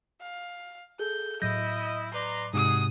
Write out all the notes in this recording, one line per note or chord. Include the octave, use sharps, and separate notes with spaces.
F5
G#4 A4 G6
A2 F#3 E4 D#5 G6 A#6
B4 D5 A#5 C6
G#2 C3 D#4 F#4 G#4 D#6